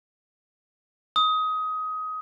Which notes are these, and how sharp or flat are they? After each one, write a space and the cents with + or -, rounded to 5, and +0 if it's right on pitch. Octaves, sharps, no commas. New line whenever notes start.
D#6 +20